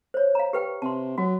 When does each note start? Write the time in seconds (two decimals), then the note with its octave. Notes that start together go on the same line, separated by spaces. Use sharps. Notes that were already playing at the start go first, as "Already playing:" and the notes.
0.14 C5 C#5
0.35 F5 A#5
0.53 G4 B4 G5
0.82 C3 A5 C6
1.18 F#3 F#4